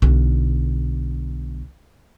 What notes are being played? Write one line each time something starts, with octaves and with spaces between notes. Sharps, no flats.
B1 D3